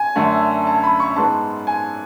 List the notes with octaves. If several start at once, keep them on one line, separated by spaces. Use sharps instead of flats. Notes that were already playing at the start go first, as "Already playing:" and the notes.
Already playing: G#5
F#2 D3 A3
A5
B5
C#6
G#2 G#3 B3 A5
G#5